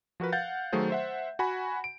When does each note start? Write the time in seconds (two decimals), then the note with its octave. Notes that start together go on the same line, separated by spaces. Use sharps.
0.20 F3 F#4 A#4 B4
0.32 F5 F#5 G6 A6
0.73 D#3 F#3 A3 G#4 C5
0.90 C5 E5 F#5
1.39 F#4 F#5 G#5 B5
1.84 D7